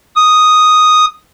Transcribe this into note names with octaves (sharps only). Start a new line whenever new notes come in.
D#6